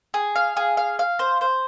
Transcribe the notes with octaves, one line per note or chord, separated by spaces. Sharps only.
G#4
F5
G#4
F5
F5
C5
C5